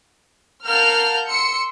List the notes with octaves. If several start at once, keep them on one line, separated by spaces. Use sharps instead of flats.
A#4 F5 F#5 A5 F6 G6
C6 E6 C#7